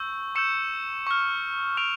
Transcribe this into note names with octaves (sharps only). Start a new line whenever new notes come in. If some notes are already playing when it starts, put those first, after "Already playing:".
Already playing: C#6 E6 G6
C#6 E6 G6 C#7 E7
C#6 F6
C#6 F6 D7 F7